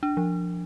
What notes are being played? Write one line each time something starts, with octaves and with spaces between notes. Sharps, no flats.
D4
F3